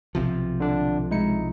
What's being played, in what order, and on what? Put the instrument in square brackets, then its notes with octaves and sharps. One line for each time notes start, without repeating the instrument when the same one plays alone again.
[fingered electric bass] B1 C3 F3
[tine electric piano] D3 D4
[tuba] G#3 [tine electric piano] D#4 E4 C#7